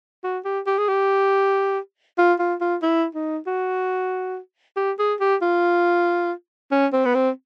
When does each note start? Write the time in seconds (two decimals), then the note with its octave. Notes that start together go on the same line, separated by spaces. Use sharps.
0.24 F#4
0.45 G4
0.67 G4
0.78 G#4
0.88 G4
2.18 F4
2.39 F4
2.61 F4
2.82 E4
3.15 D#4
3.47 F#4
4.77 G4
4.99 G#4
5.20 G4
5.42 F4
6.72 C#4
6.93 C4
7.05 B3
7.15 C4